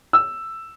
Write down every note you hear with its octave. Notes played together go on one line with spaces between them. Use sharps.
E6